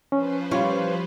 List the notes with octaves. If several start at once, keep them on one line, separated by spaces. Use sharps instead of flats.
F3 C#4 B4 C5
G3 F4 C#5